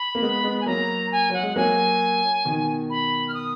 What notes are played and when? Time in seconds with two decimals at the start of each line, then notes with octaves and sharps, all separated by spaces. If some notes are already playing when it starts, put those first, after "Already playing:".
Already playing: B5
0.15 A#3
0.22 G#3 B3
0.44 G#3 B3
0.61 G#5
0.66 F#3 A#3 A#5
1.12 G#5
1.30 F#3 F#5
1.43 G#3
1.56 F#3 A#3 G#5
2.45 B2 D#3
2.90 B5
3.28 F6
3.34 D#6